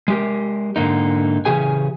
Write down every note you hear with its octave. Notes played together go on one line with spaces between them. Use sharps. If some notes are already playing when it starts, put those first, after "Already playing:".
G#3 G4 A#4
G#2 D3 A#3 D#4
C#3 E3 G4 G#4 G#5